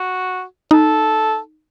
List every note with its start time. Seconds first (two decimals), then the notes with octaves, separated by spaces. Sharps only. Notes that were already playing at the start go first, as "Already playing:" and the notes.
Already playing: F#4
0.71 D#4 A4